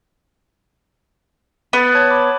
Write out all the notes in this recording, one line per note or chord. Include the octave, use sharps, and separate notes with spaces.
B3 B5 A6
C#5 A5 G#6
B5 D6